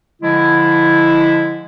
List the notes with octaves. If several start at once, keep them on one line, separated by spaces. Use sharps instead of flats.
D3 F3 G#3 E4